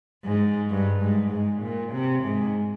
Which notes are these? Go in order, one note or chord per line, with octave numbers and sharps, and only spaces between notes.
G#2
G2
G#2
G#2
A#2
C3
G#2